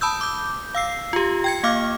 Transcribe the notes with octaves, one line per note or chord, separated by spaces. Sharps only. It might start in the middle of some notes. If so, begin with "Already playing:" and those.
A5 B5 D#6 E6 G6
D6 G6
F5 E6 C7
F4 G4
G5 G#6 C#7
A#3 F5 D6 F6